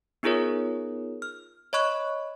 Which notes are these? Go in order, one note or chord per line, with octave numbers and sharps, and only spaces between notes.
B3 D#4 F4 G#4 A#4 C#5
F6
C#5 D#5 B5 C#6 F#6